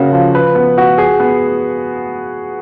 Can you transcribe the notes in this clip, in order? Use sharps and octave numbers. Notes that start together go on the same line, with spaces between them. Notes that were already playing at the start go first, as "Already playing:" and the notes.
Already playing: C#3 A#3 F#4
F3
B4
B3
F#4
G#4
B3